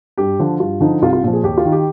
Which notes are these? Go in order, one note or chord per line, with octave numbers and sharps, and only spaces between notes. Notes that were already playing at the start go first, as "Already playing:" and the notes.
G2 G4
D3 F3
G2 F4
D3 F3 D#4
C2 F4
F4
A#2 F3
G#4
D#2 G4
F4
D#3
G4